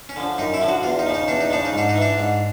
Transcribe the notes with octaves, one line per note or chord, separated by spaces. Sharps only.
C#4
D3 F3
F#2 D#4
E4
D3 F3
F#4
E2 F4
D#4
C#3 F3
D#4
E2 D4
D#4
C#3 F3 D4
D#4
G#2 D4
D#4
E3
D4
G#2